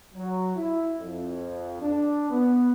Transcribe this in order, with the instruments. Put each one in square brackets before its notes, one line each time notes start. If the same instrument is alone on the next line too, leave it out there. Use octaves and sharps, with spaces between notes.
[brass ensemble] F#3
E4
F2
D4
B3